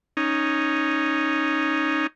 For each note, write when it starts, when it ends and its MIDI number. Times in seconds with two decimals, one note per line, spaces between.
0.17 2.07 61
0.17 2.07 63